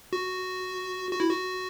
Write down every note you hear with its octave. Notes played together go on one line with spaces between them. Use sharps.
F#4
F#4
E4
F#4